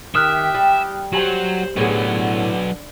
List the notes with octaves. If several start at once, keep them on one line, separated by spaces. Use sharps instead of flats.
D#3 G4 E5 D#6 F6 F#6
G3
F#3 G4 C5 F#7
A2 D3 F#3 B3 G#4